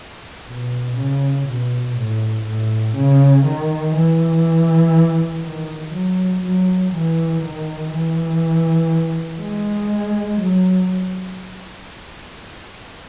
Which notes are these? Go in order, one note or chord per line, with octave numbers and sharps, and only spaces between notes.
B2
C#3
B2
A2
A2
C#3
D#3
E3
D#3
F#3
F#3
E3
D#3
E3
G#3
F#3